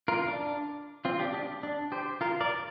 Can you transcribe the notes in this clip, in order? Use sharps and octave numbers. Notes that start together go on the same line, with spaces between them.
F4 A#4
D4
C4 F4
D4 G4
D4 G4
D4
G4 C5
F4 A#4
A#4 D5